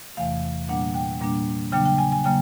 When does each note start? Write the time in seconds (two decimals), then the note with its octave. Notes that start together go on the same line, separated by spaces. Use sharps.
0.17 E2 C3 E3 A3 F5
0.69 A#2 G3 A#3 D4 F#5
0.94 G5
1.21 A#2 G3 A#3 D4
1.72 C#3 F#3 A#3 D4 G5
1.86 G5
1.98 G#5
2.12 G#5
2.24 C#3 F#3 A#3 G5